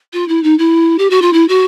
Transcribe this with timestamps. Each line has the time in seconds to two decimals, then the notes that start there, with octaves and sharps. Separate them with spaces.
0.13 F4
0.28 E4
0.43 D#4
0.58 E4
0.98 G4
1.10 F#4
1.22 F4
1.33 E4
1.48 F#4